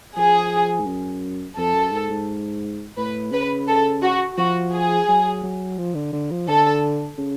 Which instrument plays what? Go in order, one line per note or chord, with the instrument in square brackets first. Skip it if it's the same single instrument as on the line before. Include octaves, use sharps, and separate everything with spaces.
[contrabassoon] F3 [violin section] G#4
[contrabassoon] G#2
F#2
[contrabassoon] F2 [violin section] A4
[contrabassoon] F#2
G#2
G#2
[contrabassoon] A2 [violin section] B4
[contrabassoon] C#3 [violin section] B4
[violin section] A4
F#4
[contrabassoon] F3 [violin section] F#4
[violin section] G#4
[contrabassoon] F#3
F#3
F3
D3
D3
F3
[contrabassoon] D3 [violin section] A4
[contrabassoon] C#3